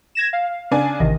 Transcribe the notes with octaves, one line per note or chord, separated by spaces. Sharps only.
G#6 A#6 E7
F5
C#3 D4 G#5
A1 C3 D#3 D#5